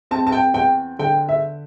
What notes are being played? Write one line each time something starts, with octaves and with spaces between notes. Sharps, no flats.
C4 A5
A5
G5
E2 G5
D3 G5
E5